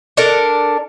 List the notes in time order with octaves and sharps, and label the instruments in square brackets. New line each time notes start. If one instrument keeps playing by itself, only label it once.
[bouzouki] D4 A4 A#4